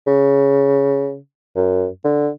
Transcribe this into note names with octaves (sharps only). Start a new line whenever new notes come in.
C#3
F#2
D3